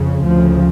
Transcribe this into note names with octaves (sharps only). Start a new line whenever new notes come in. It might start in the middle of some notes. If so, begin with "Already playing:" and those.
Already playing: F2 C#3
D2 C#3 F3